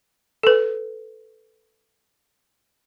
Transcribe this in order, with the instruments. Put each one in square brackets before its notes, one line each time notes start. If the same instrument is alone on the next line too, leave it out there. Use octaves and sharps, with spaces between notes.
[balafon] A4 B4